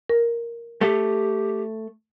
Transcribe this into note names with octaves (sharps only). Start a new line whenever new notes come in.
A#4
A3 G4